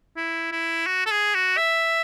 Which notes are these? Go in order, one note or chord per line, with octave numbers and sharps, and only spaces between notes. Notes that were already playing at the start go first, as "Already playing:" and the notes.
E4
E4
F#4
A4
G#4
F#4
E5